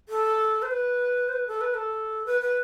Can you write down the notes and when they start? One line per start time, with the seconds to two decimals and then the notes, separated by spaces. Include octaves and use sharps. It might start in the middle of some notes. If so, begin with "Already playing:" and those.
0.09 A4
0.62 C5
0.71 B4
1.28 C5
1.33 B4
1.48 A4
1.61 B4
1.74 A4
2.26 B4
2.41 B4